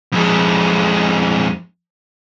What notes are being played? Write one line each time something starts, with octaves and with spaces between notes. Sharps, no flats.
F2 G#3